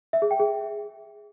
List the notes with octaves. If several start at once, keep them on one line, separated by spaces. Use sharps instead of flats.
E5
G#4
G5
G#4